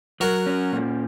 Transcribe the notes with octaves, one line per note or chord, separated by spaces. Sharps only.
F#3 F#4 A#4
C#4
A#2